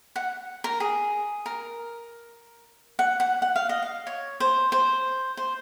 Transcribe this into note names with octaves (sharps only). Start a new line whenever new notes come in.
F#5
A#4
G#4
A#4
F#5
F#5
F#5
F5
D#5
F5
C#5
C5
C5
C5